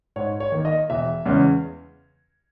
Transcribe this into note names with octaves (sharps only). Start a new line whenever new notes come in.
G#2 C#5
C#5
D#3 A#3
D#5
E1 E5
E2 C#3 G#3 C#4